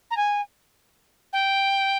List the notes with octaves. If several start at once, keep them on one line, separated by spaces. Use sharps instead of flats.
A#5
G#5
G5